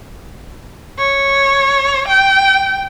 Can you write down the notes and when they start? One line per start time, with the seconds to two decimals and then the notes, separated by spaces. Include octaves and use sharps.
0.99 C#5
2.08 G5